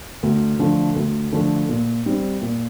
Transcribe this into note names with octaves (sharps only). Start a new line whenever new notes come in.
D2
D3 F3 A3
D2
D3 F3 A3
A#2
G3 C4
A#2